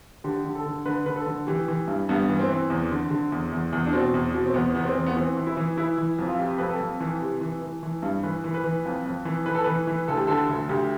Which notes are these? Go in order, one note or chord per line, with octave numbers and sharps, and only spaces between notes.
D3 G4
D3
A4
D3
D3 B4
D3 B4
A4
D3
E3 G4
E3
G2
G2 B3
E3
C4
E3
E2
D3
D3
E2
E2
E2
D4
B2 C4
E2
B2
C4
E2 B3
E2 B3
C4
E2
B3
E3 C4
E3
E4
E3
E3 E4
E3
F2
F4
C3 G4
F2 B4
A4
F2
E3
C3
E3
E3
E3
G2
E3 B4
E3
B4
E3
F2
F2
E3
E3 B4
A4
E3 B4
E3
D2 A4
G4
D3 A4
D2
D2 G4